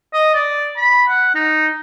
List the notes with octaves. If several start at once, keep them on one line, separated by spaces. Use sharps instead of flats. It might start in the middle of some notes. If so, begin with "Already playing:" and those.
D#5
D5
B5
F#5
D#4